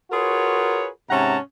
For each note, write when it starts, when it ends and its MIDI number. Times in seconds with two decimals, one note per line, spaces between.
0.11 0.88 65
0.11 0.88 66
0.11 0.88 68
0.11 0.88 70
0.11 0.88 71
0.11 0.88 73
1.09 1.36 44
1.09 1.36 48
1.09 1.36 61
1.09 1.36 78
1.09 1.36 81
1.09 1.36 82